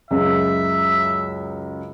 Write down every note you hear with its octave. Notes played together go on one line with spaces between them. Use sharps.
C#2 F#2 E5